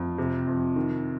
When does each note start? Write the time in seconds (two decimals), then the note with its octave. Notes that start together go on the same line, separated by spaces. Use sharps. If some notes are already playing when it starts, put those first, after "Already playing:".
Already playing: F2
0.18 C3
0.47 F2
0.76 D#3